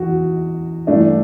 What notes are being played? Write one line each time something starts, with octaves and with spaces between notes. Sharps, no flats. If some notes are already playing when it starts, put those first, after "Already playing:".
Already playing: E2 F#4
G2 E3 A3 D4